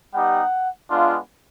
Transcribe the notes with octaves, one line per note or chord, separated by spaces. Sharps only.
G3 B3 D#4 G4 F#5
G#3 B3 D4 F4